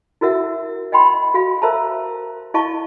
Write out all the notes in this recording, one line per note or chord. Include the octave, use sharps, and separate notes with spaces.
E4 F#4 A#4 E5 F#5
D#5 F#5 G5 B5 C6
F#4 F5
A#4 C5 E5 A5 A#5
E4 D#5 F5 A5 C#6